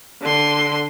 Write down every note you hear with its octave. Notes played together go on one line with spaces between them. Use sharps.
D3 C6